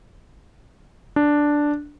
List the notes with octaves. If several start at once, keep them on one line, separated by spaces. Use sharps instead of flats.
D4